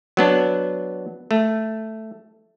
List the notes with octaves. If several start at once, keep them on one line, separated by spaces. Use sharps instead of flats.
F#3 B3 D4
A3